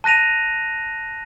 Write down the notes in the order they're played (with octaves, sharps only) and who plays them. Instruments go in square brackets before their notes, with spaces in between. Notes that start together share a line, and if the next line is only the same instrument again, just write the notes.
[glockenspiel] A5 F#6 A#6 D#7 F7